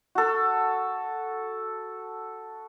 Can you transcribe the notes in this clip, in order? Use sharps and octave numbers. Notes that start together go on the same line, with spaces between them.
F#4 A4